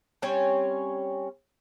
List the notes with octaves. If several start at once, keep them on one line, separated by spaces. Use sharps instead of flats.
G3 C4 C#4 C#5